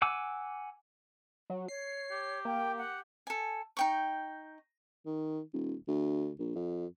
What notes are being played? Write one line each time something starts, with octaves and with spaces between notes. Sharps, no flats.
F#5 G#5 D6 E6
F#3
C#5 C7
G4
A#3 G5
F#5
A4 G#5
D#4 G5 C#6
D#3
D#1
D2
A#1
F2